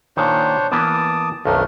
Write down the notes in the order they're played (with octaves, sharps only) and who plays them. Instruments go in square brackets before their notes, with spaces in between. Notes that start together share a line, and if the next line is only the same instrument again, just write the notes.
[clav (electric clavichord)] A#2 D#3 [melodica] D4 C5 C#5
[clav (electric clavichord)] E3 A#3 B3 [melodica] A5 D6 D#6
[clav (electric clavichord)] B1 F2 D#3 [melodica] A3 D4 A#4